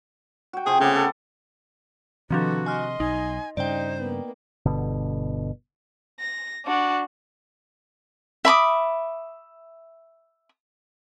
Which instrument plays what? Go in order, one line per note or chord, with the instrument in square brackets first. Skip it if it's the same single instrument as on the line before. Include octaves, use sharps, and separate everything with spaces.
[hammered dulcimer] F#4 G5
[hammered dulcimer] C3 F3 C4 [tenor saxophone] G#4
[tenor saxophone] C#3 [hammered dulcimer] A3 B3 D6
[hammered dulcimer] A4
[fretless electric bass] C3 [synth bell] D#3 F3 D4 [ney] F#4 [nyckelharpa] A4 B4
[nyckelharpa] D#5 C6 [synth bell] G#5 F6
[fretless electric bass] B1 [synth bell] D#4 [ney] G#5
[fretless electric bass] G2 C#3 [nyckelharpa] D#4 [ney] C5 [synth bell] D5 G5
[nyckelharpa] A#3 B3
[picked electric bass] G1 B2 D3
[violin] A#6
D4 F#4
[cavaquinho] E5 B5 D6 D#6